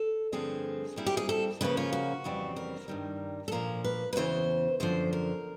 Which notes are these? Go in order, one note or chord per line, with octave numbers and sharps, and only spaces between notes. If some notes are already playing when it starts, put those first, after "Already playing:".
Already playing: A4
G2 D3 F3 A3 C4 G#4
A#2 G3 C4 E4
G4
G#4
A4
C#3 F3 A#3 C#4 B4
F4
F#4
F2 C#3 E3 G3 C4
A#4
G2 D#3 G3
A4
A#2 F3 A#3 A#4
B4
B4
E2 C#3 E3 C5
F#2 D3 F3 C5
A#4